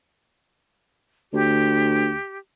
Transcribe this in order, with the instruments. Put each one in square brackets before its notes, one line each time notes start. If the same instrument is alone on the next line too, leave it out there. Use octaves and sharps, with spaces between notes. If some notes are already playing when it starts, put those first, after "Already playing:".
[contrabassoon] D2 [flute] G4